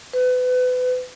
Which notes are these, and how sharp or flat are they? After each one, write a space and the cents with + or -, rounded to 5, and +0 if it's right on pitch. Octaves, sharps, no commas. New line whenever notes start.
B4 +30